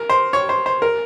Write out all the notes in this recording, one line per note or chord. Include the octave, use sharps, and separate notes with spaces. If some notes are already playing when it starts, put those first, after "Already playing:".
Already playing: A#4
C5
C#5
C5
C5
A#4